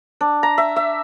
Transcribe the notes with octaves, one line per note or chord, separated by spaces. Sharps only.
D4
A#5
E5
E5